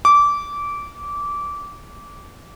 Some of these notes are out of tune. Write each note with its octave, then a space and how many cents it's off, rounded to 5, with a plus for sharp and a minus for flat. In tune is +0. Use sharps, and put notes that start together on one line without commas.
D6 -20